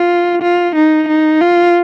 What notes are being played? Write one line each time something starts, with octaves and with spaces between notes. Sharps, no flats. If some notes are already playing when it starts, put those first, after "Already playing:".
Already playing: F4
F4
D#4
D#4
F4